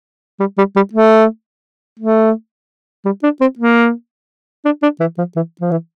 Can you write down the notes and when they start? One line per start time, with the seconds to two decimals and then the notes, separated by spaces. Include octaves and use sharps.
0.40 G3
0.58 G3
0.76 G3
0.93 A3
1.99 A3
3.05 G3
3.23 D4
3.41 C4
3.59 A#3
4.65 D4
4.83 D4
5.00 E3
5.18 F3
5.36 E3
5.61 F3
5.71 E3